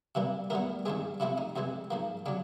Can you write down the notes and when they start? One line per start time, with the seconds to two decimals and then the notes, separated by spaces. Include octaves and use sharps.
0.15 C3 E3 G3 A#3
0.50 A2 E3 G3 B3 A#4
0.86 G2 D#3 G#3 C4 G#4
1.20 C3 F3 A3 C4 E4
1.38 D#4
1.56 F2 C3 E3 G#3
1.91 G#2 F3 A#3
2.26 C#3 F#3 D4